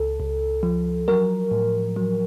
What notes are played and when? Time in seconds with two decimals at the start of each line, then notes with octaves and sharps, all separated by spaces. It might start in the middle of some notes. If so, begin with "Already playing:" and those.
Already playing: C#2 A4
0.20 C#2
0.63 F3
1.08 F#3 A#4
1.51 A2
1.96 F#3